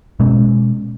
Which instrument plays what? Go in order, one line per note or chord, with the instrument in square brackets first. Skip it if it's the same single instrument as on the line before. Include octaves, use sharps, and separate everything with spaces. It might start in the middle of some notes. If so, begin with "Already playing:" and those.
[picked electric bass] B2 G#3 C#4